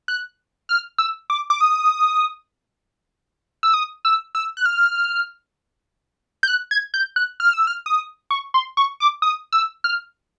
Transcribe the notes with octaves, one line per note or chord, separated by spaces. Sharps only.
F#6
F6
E6
D6
D6
D#6
E6
D#6
E6
E6
F#6
F6
G6
F#6
G#6
G6
F#6
F6
E6
F6
D#6
C#6
C6
C#6
D6
D#6
E6
F6